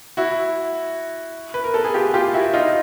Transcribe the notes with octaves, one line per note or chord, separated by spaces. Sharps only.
E4 F#4
B4
A#4
A4
G#4
F4 G4
F4 G4
E4 F#4
D#4 F4